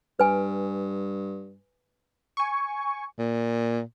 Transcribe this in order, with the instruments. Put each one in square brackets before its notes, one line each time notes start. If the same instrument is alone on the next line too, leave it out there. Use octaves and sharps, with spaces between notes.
[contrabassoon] G2 [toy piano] B4 G#5
[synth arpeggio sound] G#5 C#6
[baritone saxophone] A#2